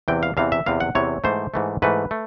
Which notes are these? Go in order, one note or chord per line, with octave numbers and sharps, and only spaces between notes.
E2 C3 E3 G5
F5
E2 C3 E3 F5
E5
E2 C3 E3 F5
F#5
E2 C3 E3 C#5
G#2 E3 A3 C5
G#2 E3 A3
G#2 E3 A3 B4
A3